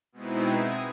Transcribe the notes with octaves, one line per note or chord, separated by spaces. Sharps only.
B2 G#3 B3 C4 D#4 E4
G#5 D#6